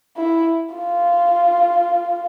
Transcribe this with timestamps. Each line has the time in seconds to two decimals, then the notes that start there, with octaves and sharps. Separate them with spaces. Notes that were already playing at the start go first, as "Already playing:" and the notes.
0.17 E4
0.75 F4